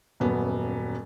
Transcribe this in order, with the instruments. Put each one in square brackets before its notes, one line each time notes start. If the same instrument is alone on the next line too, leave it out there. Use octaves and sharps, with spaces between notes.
[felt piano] D#1 F#2 B3